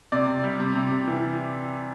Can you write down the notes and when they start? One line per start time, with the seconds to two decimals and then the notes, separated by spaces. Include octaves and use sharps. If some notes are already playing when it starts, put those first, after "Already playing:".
0.12 C3 D5
0.27 C3
0.43 G3
0.60 C3
0.75 C3
0.91 C3
1.07 E3